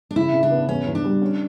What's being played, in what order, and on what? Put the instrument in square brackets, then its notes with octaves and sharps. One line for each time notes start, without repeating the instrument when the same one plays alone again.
[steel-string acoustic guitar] D4
[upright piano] C#3 [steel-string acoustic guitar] E4
[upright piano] C#3
[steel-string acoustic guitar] D4
[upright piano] B3
[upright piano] E2 [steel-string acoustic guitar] C#4
[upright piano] E2
[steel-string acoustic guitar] D4
[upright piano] G3
C#4